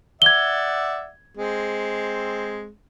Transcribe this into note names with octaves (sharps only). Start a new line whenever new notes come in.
D5 E5 F#5 G#6 G7
G#3 C4